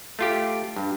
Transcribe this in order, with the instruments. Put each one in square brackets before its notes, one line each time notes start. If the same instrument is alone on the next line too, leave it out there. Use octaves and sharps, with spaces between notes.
[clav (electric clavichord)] A3 F4 G4
G2